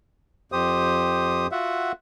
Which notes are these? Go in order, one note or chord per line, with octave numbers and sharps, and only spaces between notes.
F2 G4 C5 D#6
F4 F#4 E5 F#5